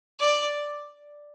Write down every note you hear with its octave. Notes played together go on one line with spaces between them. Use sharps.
D5